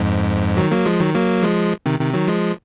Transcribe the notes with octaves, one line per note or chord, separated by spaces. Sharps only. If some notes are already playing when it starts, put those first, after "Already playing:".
Already playing: F2 G#2
D#3 F#3
F#3 A#3
F3 G#3
D#3 F#3
F#3 A#3
F3 G#3
C3 D#3
C3 D#3
D#3 F#3
F3 G#3